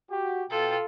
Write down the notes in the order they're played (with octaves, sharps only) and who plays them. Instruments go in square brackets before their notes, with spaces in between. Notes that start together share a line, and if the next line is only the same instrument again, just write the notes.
[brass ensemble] F#4 G4
[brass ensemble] B2 G5 [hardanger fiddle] F4 A4